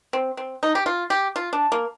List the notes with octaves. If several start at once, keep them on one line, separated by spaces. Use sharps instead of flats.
C4
C4
D#4
G4
F4
G4
F4
D4
A#3